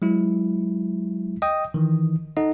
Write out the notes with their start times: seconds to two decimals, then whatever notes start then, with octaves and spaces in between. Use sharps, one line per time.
0.02 F#3 G#3 E4
1.42 D#5 G5 D#6
1.74 D#3 E3
2.37 D#4 A4 D#5 F#5